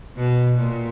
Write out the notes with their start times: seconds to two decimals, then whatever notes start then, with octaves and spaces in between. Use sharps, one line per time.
0.18 B2
0.59 A#2